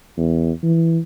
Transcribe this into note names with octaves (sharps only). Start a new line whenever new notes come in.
E2
E3